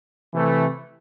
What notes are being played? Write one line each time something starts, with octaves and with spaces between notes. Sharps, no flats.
C3 E3 A3